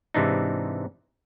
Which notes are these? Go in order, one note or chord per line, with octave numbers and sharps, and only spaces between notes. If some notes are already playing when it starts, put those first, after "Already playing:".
G#2 C3 E3 D4 D#4